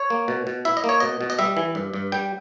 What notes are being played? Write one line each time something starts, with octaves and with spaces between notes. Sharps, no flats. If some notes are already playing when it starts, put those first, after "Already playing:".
Already playing: C#5
A#3
B2
B2
E4 E5
D#5
A#3
C#5
B2 D#5
B2
D#5
G3 E5
E3
G2
G2
G3 G5